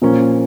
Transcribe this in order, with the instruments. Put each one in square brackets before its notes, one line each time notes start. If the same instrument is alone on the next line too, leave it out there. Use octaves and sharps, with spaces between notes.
[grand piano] A#2 F3 A#3 C#4